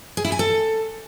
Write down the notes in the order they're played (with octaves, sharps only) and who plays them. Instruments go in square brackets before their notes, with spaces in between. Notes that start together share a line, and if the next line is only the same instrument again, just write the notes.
[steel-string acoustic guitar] G#4
E4
G#5
A4